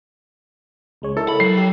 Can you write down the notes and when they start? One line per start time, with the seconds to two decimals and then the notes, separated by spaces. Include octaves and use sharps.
1.02 C#2 G#3 C#5
1.17 E4 A4 A#4
1.29 B5
1.40 F#3 C7
1.57 G4